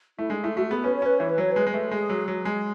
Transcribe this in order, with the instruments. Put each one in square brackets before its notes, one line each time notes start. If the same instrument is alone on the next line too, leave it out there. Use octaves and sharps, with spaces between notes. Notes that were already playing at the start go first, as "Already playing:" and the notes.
[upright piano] A3 [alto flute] E4
[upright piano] G#3 [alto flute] D4
[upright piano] A3 [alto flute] E4
[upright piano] A3 [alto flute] F#4
[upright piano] B3 [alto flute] G#4
[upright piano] C#4 [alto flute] B4
[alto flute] C#5
[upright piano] C#4 [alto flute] B4
[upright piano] E3 [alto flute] C#5
[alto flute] B4
[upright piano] F#3 [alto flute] C#5
[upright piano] G#3 [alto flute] B4
[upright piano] G#3
A3
[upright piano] G#3 [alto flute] G#4
[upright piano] F#3
F#3
G#3